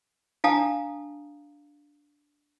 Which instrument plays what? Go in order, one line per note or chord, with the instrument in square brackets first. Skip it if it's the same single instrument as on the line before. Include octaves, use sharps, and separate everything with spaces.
[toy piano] D4 F5 A5 A#5 D#6